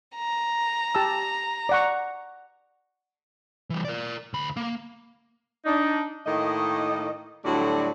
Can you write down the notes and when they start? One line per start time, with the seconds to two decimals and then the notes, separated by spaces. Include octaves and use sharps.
0.16 A#5
0.95 G4 A5 E6
1.69 D5 F#5 C#6
3.70 E3 G3
3.85 A#4 D5
4.34 D2 B5
4.57 A#3
5.65 D4 D#4
6.26 A2 D#3 A#3 D#5
7.45 A2 D3 F#3 G3 F#4 D5